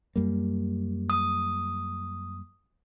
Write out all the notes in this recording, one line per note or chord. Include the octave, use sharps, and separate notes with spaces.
F#2 G3 A#3
D#6